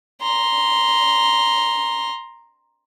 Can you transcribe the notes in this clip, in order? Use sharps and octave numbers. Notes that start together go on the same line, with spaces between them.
A#5 C6